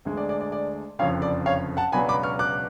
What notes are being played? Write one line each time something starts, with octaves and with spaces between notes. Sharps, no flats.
D2 D3 G#3
D5
D5
D5
D5
F#1 F2 D3 F3 C#5 F5
D5
C#5 F5
F#5 A5
C#2 B2 F#3 B3 D4 G#5 B5
B5 D6
C#6 F6
D6 F#6